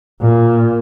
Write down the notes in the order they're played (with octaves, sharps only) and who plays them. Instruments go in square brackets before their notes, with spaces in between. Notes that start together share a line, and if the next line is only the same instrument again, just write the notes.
[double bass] A#2